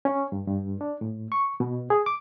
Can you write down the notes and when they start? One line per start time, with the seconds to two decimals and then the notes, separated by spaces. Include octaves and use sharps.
0.05 C#4
0.32 G2
0.48 G2
0.81 D4
1.01 A2
1.32 C#6
1.60 B2
1.90 G#4
2.06 D6